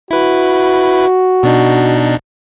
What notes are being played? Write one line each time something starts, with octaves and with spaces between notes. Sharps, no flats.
E4 F#4 B4
B2 D4 D#4